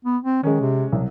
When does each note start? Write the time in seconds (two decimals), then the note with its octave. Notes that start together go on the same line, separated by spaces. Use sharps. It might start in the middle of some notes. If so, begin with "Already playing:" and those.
0.05 B3
0.24 C4
0.43 D#3 G#3 C#4
0.60 C3
0.92 C2 F#3